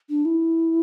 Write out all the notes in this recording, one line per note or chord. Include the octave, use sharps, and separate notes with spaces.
D4
E4